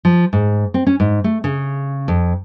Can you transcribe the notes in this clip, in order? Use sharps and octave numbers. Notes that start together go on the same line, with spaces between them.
F3
G#2
C4
C#4
G#2
A3
C#3
F2